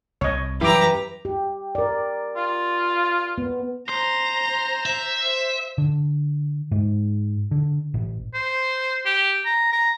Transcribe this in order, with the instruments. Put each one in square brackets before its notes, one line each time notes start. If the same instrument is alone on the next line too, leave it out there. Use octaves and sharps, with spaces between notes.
[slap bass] C2 [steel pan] C#5 D#5
[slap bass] F#2 E3 G3 [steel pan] E4 D6 [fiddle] G4 A#5 [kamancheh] B4
[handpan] G4
A#4 D5
[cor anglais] F4
[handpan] B3
[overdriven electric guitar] C5 [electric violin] A#5
[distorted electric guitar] E5
[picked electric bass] D3
G#2
D3
A1
[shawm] C5
G4
A#5
A#5